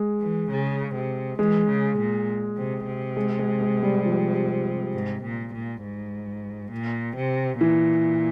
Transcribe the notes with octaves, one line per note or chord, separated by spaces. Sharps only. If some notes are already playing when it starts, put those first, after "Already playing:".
Already playing: G#3
E3
C#3
C3
E3 G#3
C#3
A#2
C3
C3
G#3
G#3
G#3
G3
F3
G#2
A#2
A#2
G#2
A#2
C3
A#2 E3